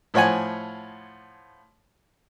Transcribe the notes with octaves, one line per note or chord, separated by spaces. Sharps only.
A2 F3 C#5 F#5 G#5